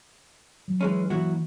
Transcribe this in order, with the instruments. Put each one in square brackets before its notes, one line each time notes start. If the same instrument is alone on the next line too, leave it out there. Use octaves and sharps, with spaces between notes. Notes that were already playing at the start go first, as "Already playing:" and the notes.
[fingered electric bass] F#3
[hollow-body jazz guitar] E3 G#3 C#4
[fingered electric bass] E3 A#3 [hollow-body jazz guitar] F#3 E4 F#4